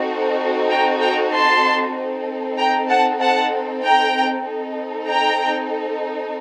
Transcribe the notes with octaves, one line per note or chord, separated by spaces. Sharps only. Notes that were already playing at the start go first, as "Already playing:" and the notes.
Already playing: C4 D#4 F#4 A4
G5 A#5
G5 A#5
A5 C6
C4 D#4 A4
G5 A#5
F#5 A5
F#5 A5
G5 A#5
C4 D#4 A4
G5 A#5